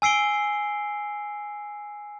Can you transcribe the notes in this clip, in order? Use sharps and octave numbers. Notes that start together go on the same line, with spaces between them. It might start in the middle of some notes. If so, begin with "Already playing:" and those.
G#5 E6 C7 D7 G7